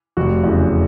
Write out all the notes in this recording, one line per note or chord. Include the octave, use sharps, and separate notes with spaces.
F1 F#4
E2 C#3